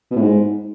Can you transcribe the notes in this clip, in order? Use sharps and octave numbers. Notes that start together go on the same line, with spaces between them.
B2
A2
G#2